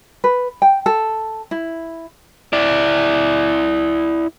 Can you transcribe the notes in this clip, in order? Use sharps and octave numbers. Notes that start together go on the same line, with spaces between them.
B4
G5
A4
E4
E4 D5